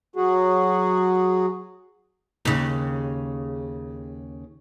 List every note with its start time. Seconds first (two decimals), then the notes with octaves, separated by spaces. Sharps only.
0.16 F#3 F#4 G#4
2.45 D#2 C#3